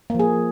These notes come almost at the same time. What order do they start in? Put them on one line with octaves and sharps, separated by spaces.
A#3 F3 G#4